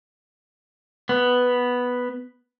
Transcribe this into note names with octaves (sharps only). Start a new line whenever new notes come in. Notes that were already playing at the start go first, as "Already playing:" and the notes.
B3